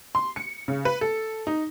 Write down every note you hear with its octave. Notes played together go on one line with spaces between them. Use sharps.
C6
C#7
C#3
B4
A4
D#4